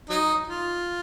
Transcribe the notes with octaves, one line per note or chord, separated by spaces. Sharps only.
F#3 D#4
F4